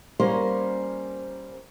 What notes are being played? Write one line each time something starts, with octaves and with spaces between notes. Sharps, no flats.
G3 A#3 C#4 A#4 C5